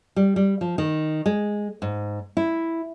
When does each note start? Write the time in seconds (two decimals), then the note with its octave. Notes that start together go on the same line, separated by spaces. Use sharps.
0.16 G3
0.36 G3
0.61 F3
0.78 D#3
1.26 G#3
1.82 G#2
2.37 E4